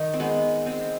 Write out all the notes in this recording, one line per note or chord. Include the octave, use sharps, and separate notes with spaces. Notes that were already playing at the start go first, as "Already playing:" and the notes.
Already playing: D#3 D#4
C4
G#3 B3
G#3 C4